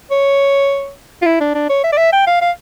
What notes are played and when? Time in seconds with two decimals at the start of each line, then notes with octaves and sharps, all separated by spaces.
0.11 C#5
1.22 F4
1.25 E4
1.40 D4
1.54 D4
1.69 C#5
1.83 E5
1.92 D5
1.97 E5
2.13 G5
2.27 F5
2.41 F5